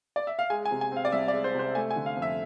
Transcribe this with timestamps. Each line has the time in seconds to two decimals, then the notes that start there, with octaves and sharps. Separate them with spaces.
0.16 D5
0.27 E5
0.39 F5
0.50 G#3 G#5
0.65 G#5
0.71 C3
0.81 G#5
0.92 C4 F5
1.05 D5
1.12 C2 E5
1.28 D5
1.34 G#3
1.44 C5
1.54 C3 C5
1.75 A3 G#5
1.91 G#5
1.96 D3
2.06 F5
2.16 F2
2.22 E5